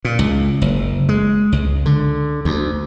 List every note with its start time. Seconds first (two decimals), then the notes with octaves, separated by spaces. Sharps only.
0.05 A#2
0.19 C#2
0.62 F#1
1.09 G#3
1.52 C#2
1.86 D3
2.45 D2